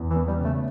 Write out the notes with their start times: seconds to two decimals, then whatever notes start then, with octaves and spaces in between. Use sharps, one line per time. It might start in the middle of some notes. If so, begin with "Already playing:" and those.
Already playing: E2
0.10 E3
0.16 B3
0.27 G3
0.39 C#3
0.44 A3